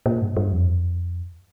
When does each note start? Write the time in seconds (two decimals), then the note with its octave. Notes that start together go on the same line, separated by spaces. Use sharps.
0.06 A#2
0.22 G2
0.37 G2
0.52 F2